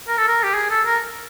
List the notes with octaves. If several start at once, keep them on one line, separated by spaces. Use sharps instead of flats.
A#4
A4
A#4
G4
G#4
A4
A#4